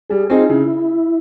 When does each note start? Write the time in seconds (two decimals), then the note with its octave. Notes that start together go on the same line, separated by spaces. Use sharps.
0.10 G3 G#4
0.30 C4 D#4 F4 G#4
0.50 C#3 E4